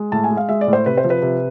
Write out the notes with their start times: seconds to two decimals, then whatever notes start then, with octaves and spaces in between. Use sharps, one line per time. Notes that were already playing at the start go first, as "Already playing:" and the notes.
Already playing: G#3
0.12 A2 A5
0.24 G#5
0.30 G#3
0.37 F5
0.49 G#3 E5
0.61 D5
0.67 A2
0.73 C5
0.86 C3 B4
0.97 C5
1.04 F3
1.10 B4
1.22 C3